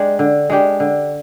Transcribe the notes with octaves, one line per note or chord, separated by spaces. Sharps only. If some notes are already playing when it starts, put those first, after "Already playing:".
Already playing: G#3 D4 G4
D3
G#3 D4 G4
D3